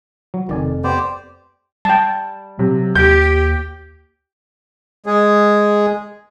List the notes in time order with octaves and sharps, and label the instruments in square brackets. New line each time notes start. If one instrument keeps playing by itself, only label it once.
[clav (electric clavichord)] F#3
[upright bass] F1 [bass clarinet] F2 [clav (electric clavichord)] D#3 D5 G#5
[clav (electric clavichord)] B3 [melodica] G4 C5 D5
[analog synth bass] G3 [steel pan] G5 A5
[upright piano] C3 [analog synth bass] F#3
[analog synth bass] D#2 [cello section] G4 [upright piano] G6
[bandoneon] G#3 G#4